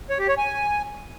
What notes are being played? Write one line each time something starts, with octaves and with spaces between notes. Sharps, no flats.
C#5
G4
C#5
G#5